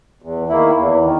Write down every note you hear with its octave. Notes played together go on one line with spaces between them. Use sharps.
E2
D#3 A#3 E4
E2
D#3